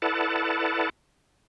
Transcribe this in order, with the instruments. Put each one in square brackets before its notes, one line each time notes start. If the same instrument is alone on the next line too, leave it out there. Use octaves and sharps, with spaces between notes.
[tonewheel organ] E4 A4 B4 D5 F#5 A5